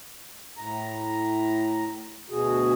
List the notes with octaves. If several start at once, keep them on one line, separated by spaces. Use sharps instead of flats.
A2 A#5
D2 B2 F#4 G#4